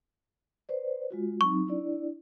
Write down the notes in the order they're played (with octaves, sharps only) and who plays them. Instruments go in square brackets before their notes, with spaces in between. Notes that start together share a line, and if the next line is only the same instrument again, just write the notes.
[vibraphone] B4 C5 D5
G#3 F4 F#4
[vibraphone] F#3 C4 D#4 [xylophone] C#6
[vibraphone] D4 E4 D5